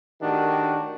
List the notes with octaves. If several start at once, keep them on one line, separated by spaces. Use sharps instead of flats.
A2 D#3 D4 F#4 G4